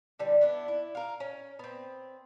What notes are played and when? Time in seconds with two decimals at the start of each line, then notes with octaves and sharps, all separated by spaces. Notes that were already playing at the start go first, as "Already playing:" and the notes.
0.19 D3 E3 G3
0.41 B3 D4 E4
0.68 E4
0.95 A#4 F5
1.20 C#4
1.59 B3 C4